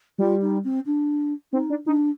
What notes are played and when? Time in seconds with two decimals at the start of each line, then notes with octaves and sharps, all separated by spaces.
0.18 G3 F4
0.41 D#4
0.64 C4
0.86 D4
1.53 C4 D#4
1.70 D4
1.86 D4 D#4